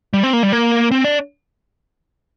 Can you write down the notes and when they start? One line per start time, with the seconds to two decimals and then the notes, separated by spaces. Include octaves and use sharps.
0.13 G3
0.23 C4
0.33 A#3
0.43 G3
0.52 A#3
0.91 C4
1.04 D4